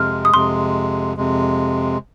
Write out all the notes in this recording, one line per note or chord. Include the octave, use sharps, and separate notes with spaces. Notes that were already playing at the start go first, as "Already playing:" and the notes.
Already playing: F2 C3 G#3 F6
D#6
F2 C3 G#3 C6
F2 C3 G#3